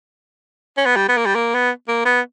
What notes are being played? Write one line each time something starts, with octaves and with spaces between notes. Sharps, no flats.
C#4
B3
G3
B3
A#3
G3
A#3
B3
A#3
B3